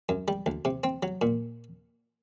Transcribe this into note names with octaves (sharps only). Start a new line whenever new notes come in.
F#2
G3
D2
C3
C4
F#3
A#2